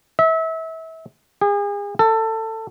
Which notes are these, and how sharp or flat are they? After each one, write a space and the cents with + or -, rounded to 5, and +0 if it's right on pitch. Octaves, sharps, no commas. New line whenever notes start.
E5 -30
G#4 -35
A4 +20